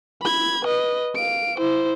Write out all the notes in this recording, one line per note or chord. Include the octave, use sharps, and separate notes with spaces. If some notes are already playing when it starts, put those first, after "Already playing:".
B5 G#6
B4 D#5
F5 D7
E4 C5